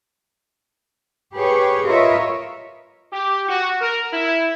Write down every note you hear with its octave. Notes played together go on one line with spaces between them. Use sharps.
G4 G#4 B4 C#5
F4 A#4 B4 C#5 D#5 E5
G4
F#4
A#4
E4